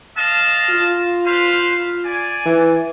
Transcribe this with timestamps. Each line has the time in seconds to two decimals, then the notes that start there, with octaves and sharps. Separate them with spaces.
0.16 D#5 F5 A5
0.71 F4
1.26 B4 C5 F5
2.03 D5 G#5
2.46 E3